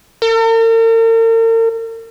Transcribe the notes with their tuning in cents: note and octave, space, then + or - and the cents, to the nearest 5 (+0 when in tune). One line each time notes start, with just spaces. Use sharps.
A#4 -45